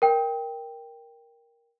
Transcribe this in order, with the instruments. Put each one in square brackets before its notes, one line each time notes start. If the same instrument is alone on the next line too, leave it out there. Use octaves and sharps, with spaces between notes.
[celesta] A#4 G5